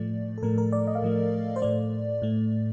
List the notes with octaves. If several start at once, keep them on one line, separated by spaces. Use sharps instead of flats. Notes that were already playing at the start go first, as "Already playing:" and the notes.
Already playing: A2 F3 A3 D5
A4
A2 F3 A3 A#4
A#4
D5
D#5
F5
A2 F3 A3 D#5
C5
A2 A3 D5
A2 A3